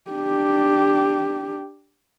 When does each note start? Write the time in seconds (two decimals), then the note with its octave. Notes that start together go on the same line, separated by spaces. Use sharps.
0.11 D4 G4